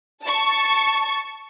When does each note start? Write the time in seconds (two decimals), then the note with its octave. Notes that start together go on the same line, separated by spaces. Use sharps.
0.24 A5 C#6